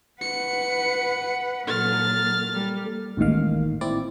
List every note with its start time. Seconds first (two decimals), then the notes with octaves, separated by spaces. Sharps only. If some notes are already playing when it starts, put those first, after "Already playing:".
0.21 B4 F#5 C#7
1.67 A#2 F#3 A#3 A4 F6 A6
2.54 G3
3.17 A1 D#2 G#2 D#3 F5
3.81 C4 E4 D5